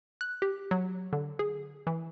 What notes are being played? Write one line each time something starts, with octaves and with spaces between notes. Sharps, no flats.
F#6
G4
F#3
D3
G#4
E3